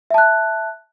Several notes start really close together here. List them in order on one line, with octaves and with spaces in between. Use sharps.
E5 A5 F#6